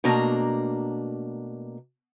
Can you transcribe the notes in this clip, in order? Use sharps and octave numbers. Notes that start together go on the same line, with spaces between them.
B2 A3 A#3 D4 A#5